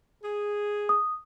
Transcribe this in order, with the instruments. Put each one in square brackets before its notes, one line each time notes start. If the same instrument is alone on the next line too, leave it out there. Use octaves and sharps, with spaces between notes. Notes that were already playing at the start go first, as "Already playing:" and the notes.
[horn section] G#4
[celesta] D#6